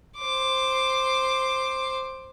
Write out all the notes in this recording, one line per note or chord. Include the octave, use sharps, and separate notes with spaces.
C5 D6